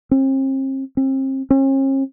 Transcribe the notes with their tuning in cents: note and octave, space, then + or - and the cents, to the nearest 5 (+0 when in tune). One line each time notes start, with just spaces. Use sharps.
C4 +40
C4 +35
C#4 -45